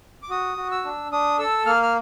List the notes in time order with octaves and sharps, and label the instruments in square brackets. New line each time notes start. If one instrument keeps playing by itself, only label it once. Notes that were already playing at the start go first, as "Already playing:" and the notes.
[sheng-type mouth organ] D6
F#4 D#6
F#4
E6
D4
D4 D#6
A4 E6
A#3 F6
F6